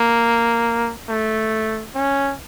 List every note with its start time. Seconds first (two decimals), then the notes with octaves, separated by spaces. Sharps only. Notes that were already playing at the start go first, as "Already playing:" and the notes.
Already playing: A#3
1.09 A3
1.95 C#4